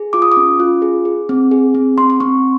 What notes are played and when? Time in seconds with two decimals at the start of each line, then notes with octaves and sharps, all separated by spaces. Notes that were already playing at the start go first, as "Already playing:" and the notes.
Already playing: G#4
0.13 F4 D6
0.22 D#6
0.32 D6
0.37 C#4
0.60 F4
0.82 G#4
1.05 G#4
1.29 C4
1.51 G#4
1.75 C4
1.98 C4 C6
2.10 C6
2.20 C4 C#6